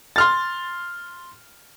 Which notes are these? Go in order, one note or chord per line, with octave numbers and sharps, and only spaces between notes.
C6 F6 A6